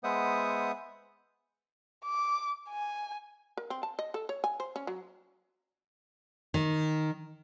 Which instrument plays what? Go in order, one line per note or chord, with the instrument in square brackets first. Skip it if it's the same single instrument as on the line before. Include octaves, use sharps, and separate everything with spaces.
[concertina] G#3 B3 C5 E5 F#5 D#6
[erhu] D6
G#5
[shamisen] A#4
C4
A5
D#5
A4
C#5
G#5
C5
C#4
F#3
[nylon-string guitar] D#3